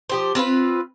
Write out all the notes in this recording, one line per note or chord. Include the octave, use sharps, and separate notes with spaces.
F3 G4 C5
C4 F4 B4 F5